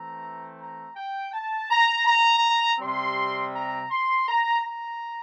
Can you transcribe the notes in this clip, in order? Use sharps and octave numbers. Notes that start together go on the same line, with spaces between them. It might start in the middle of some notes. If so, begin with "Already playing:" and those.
Already playing: E3 A3 C4 A#5
A#5
G5
A5
A#5
A#5
C3 G3 C4 C6
A#5
C6
A#5
A#5